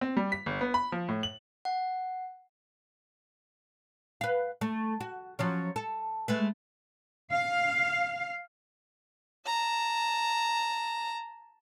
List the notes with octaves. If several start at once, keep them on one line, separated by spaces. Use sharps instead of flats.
C4
G3
B6
G1
B3
B5
F3
A2
F#7
F#5
B4 F5
A3
F#4
F3 F#3 C#4
A4
G#3 A3 B4
F5
A5 A#5